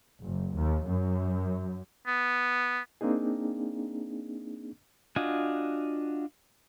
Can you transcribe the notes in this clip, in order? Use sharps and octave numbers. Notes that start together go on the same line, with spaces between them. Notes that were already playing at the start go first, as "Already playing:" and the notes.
F#1
D#2
F#2
B3
A#3 C4 D4 D#4 G#4
D4 F4 F#4 D#5 G#5